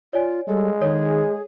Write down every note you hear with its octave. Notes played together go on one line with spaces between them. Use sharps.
F4 C#5 D5 G#5
G3 G#3 A4
D#3 G#4 A4 C#5